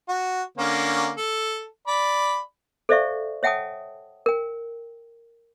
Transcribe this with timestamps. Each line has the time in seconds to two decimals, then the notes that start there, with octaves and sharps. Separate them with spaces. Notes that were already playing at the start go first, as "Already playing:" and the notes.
0.09 F#4
0.58 D3 A#3 C#4
1.17 A4
1.87 D5 B5
2.89 A4 C5 D5 E5 F5 C#6
3.43 C#5 E5 F#5 G5 A5 D#6
4.26 A#4 G5